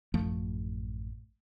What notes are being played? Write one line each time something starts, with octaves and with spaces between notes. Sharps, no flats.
A1 F#2 F3 A3